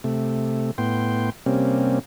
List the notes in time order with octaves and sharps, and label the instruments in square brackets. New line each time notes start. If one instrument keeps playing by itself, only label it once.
[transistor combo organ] C3 A3
A2 B3 G5 C6
C3 G3 A#3 C4 C#4